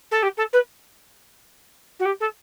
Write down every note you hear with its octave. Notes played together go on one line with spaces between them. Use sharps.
A4
G4
A4
B4
F#4
G4
A4